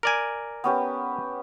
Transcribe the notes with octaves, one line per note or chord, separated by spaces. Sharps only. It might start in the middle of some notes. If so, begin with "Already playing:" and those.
A#4 D5 G#5
B3 C#4 G4